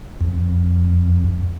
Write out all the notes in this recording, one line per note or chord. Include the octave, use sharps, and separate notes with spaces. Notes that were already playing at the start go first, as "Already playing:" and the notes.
F2